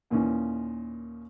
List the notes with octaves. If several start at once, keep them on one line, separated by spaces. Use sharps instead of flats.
D#2 A#2 D#3 E3 C#4